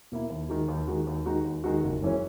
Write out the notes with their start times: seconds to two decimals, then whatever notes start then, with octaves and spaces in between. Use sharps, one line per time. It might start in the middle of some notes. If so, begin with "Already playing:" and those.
0.12 B2 A#3 E4
0.30 D#2
0.49 D#3 G#3 D#4 F#4
0.68 D#2
0.88 D#3 G#3 D#4 F#4
1.07 D#2
1.26 D#3 G#3 D#4 F#4
1.45 D#2
1.64 D#3 G#3 D#4 F#4
1.83 F#1
2.02 F#2 E3 G#3 C#4